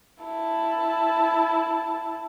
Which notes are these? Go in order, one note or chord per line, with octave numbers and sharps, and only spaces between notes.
E4 A5